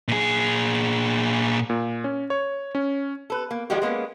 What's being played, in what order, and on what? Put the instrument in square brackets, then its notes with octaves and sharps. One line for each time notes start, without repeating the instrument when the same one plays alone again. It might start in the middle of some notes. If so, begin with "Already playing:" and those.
[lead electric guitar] A#2 G#4
[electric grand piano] A#2
C#4
C#5
C#4
[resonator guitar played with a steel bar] A4 B4
A#3
D#3 F3 G3 G#3 F#4 G4
G#3 A#3 B3 C#4